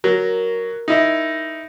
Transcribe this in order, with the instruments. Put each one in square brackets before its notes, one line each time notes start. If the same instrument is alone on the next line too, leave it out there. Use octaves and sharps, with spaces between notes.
[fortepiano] F#3 [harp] A#4
[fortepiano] D#4 E4 D#5